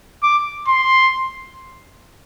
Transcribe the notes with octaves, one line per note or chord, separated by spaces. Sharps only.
D6
C6